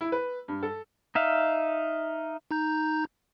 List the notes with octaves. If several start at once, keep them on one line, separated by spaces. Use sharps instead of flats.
E4
B4
G2
A4
D#4 E5 F5
D#4 A#5 G6